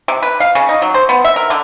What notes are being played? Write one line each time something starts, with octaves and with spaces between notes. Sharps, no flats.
C3
B4
F5
C#3
D#4
F#3
C5
B3
E5
A#4
D3